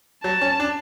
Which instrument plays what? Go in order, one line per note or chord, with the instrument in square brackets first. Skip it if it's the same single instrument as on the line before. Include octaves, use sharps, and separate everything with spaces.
[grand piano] F#3 [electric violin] A5
[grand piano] C#4
D4